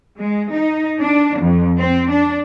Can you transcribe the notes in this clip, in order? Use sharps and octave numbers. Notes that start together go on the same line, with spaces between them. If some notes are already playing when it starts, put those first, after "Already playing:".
G#3
D#4
D4
F2
C4
D4